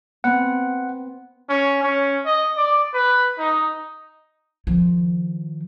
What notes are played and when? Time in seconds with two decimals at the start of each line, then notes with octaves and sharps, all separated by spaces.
0.24 B3 C4 F#5
1.50 C#4
1.83 C#4
2.26 D#5
2.57 D5
2.94 B4
3.38 D#4
4.67 D#3 F3